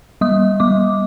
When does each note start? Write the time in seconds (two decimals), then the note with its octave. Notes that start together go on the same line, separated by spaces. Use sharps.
0.21 G3 D#6
0.60 G3 D6